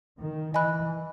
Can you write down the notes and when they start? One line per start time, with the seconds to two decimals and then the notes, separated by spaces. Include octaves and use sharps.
0.20 D#3
0.54 E3 D#5 G#5 B5 F#6